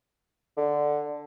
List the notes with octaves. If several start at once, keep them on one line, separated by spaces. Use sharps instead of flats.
D3